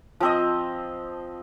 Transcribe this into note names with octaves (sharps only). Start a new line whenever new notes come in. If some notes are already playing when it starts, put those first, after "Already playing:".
F3 C4 D#5